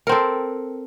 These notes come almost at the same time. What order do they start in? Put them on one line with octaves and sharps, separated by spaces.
A#4 C4 A4